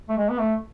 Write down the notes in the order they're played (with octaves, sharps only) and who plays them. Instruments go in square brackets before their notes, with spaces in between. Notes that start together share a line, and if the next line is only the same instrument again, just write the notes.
[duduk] A3
G#3
B3
A3